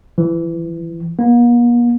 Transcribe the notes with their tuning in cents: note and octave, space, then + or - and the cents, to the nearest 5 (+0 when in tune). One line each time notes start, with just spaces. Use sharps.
E3 +25
A#3 +45